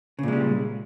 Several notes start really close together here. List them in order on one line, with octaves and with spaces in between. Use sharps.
C#3 A#2 G#3 G3